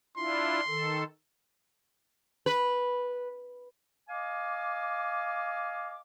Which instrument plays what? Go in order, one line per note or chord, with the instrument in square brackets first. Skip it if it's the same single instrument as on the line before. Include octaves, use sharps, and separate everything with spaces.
[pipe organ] D4 E4 F4 [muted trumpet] C6
[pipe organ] D#3 A4
[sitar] B4
[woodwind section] D#5 F5 G#5 D6